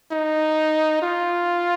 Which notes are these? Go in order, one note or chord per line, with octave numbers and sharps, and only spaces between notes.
D#4
F4